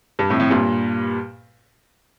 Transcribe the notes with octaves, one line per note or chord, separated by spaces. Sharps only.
G2
F2 A2
F2 A2
G2 A#2